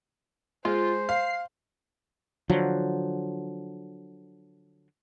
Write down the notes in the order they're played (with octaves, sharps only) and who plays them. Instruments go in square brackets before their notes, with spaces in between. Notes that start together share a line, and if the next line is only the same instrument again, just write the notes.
[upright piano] G#3 [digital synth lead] F4 [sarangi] C5
[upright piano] F5 [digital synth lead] C7
[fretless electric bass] D3 F3 F#3